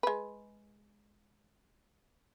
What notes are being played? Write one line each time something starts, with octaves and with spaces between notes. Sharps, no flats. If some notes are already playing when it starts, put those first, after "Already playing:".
G#3 B4